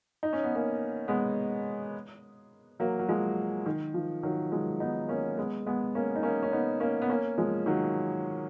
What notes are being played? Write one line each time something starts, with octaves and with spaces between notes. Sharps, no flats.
D#4
C#4
B3
A#3 C#4
G#3 B3
F#3 A#3
F#3
F3 G#3
D#3
F3
D#3 F#3
F3 G#3
B3 D#4
A#3 C#4
G#3 B3
G#3 B3
A#3 C#4
D#4
A#3 C#4
C#4
B3 D#4
A#3 C#4
B3
A#3 C#4
F3 G#3
D#3 F#3